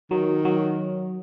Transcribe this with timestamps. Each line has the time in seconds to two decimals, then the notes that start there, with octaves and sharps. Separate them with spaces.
0.11 D#3 F#3
0.45 F#3